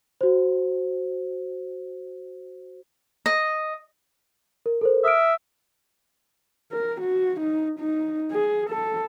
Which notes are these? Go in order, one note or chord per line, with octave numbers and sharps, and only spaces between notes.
F#4 C5
D#5
A#4
A4 A#4 C5
E5 D#6 F6 D7
A#4
F#4
D#4
D#4
G#4
A4